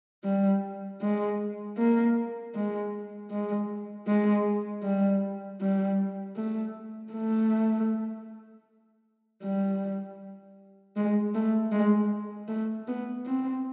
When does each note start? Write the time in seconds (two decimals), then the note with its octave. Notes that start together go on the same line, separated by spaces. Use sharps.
0.24 G3
1.01 G#3
1.77 A#3
2.55 G#3
3.31 G#3
4.07 G#3
4.83 G3
5.61 G3
6.36 A3
7.13 A3
9.42 G3
10.96 G#3
11.35 A3
11.72 G#3
12.48 A3
12.87 B3
13.26 C4